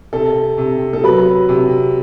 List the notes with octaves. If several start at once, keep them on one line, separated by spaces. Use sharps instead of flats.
C3 A4
C3
A4
F#3 B4
C3